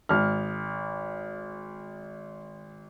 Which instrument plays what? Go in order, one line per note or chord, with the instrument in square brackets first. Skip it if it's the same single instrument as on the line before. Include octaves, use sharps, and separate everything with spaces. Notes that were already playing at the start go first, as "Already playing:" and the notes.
[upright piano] G#1 F6